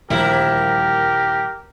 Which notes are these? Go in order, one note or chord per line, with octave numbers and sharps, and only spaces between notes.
D#1 D2 F3 G3 A#3 E4 G4 A#4